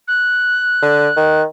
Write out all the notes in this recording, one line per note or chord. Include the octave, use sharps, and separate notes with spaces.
F#6
D3
D#3